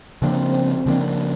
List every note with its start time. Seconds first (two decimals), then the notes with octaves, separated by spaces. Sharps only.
0.22 C#3 F3 A#3 C4 D4
0.86 C#3 F3 A#3 D4